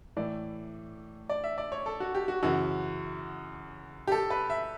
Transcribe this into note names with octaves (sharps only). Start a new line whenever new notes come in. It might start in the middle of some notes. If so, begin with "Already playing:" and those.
A2 E3 D5
D5
E5
D5
C#5
A4
F#4
G4
F#4
F#2 C#3 E3 F#4
G4
A4
B4
E5